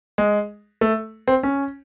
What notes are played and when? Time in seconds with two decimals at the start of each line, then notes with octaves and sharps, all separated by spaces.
0.18 G#3
0.81 A3
1.28 C4
1.43 C#4